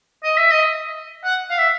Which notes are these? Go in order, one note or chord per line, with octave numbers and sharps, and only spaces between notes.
D#5
E5
D#5
F#5
F5
E5